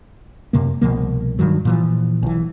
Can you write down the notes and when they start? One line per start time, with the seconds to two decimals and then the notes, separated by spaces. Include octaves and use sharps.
0.53 F#2 C3 A#3
0.81 C2 B2 F3 A#3
1.39 G2 D#3 F#3
1.65 A#2 E3 F3
2.23 B1 E3